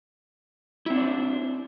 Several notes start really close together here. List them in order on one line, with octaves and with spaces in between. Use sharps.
E4 C4 D4 D5 C5